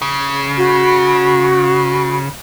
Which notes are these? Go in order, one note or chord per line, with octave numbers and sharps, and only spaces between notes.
C#3
F#4